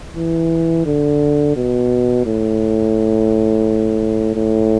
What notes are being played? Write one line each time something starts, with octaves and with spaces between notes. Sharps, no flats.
E3
D3
B2
A2
A2